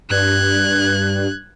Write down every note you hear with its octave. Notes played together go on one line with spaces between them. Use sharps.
G2 F#6 G#6